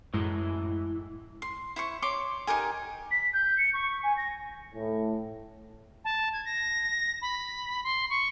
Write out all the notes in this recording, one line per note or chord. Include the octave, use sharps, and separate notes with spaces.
F#2 A2 E3 G#3
C6
E4 C5 C#6
C#5 C6 D6
D#4 G4 A#4 G#5
B6
G6
C#7
C#6
G#5
A#6
A2
A5
G#6
A#6
B5
C6
C#6